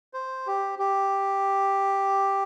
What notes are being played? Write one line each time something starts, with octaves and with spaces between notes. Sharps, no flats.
C5
G4
G4